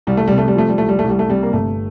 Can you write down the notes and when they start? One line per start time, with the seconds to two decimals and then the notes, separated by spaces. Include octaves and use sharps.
0.07 C2 G3
0.17 A3
0.28 C3 G3
0.38 A3
0.48 G3
0.56 F3 A3
0.68 G3
0.78 C2 A3
0.89 G3
0.99 A3
1.04 C2
1.09 G3
1.19 A3
1.28 C3 G3
1.43 A#3
1.53 G1 A3